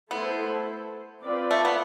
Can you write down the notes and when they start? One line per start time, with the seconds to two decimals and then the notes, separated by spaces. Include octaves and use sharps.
0.11 A3 B3 E4 A4 C5
1.22 C4 F4 B4 D5
1.51 A3
1.65 B3